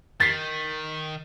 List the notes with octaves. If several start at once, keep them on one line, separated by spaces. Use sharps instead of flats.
D#3 A6 B6 C7